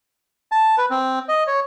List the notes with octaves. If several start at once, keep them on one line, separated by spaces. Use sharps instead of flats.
A5
B4
C4
D#5
C#5